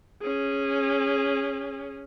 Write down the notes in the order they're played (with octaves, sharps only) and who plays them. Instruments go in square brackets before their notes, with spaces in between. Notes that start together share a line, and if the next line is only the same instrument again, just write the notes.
[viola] C#4 G#4